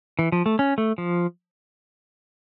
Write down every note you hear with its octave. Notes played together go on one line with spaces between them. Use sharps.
E3
F3
A3
C#4
A3
F3